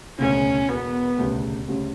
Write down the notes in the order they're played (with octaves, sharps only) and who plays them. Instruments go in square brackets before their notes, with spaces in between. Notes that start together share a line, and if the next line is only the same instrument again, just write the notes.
[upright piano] E1 D2 C#3 [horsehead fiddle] C#4
[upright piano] E1 E2 B2 [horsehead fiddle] B3
[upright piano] E1 D2 C#3 G3
D2 C#3 G3 C#4